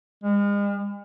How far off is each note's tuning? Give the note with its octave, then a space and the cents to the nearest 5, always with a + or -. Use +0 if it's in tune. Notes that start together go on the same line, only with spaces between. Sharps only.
G#3 -40